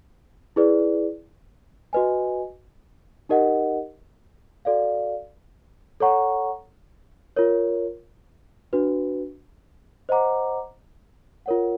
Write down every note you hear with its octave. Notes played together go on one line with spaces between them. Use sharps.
E4 G#4 B4 D5
F#4 B4 D#5 G#5
D#4 G4 A#4 D#5 F#5
F#4 A4 D5 F5
A4 C#5 F#5 A#5 C#6
F4 A#4 C#5
D4 F#4 B4
C5 D#5 F#5 A#5 D6
F4 A#4 C#5 F#5